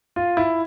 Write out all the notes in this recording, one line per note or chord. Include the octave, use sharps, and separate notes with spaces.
F4
E4